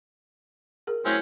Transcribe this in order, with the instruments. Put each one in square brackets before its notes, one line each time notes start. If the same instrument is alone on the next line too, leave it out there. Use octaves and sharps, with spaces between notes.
[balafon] G#4 A#4
[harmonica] F#3 C4 C#4 [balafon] A3 E4 G#5